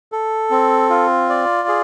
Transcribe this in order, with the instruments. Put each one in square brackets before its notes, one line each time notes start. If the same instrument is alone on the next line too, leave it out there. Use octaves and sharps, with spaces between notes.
[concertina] A4
C4
F4
D5
G#4